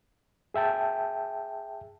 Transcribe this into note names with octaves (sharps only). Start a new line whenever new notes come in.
G#4 E5 G5 A5